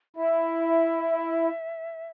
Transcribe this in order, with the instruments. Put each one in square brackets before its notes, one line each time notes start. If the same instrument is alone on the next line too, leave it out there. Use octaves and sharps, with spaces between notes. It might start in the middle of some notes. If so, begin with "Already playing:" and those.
[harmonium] E4 [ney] E5